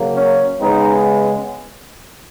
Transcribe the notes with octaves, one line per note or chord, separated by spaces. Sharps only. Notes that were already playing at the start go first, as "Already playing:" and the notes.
Already playing: C#3 F#3 A#3
C#4
C#3 G#3 B3 D#4